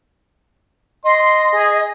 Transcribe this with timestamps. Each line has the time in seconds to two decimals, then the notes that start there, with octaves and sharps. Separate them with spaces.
1.04 D#5 C6
1.53 G#4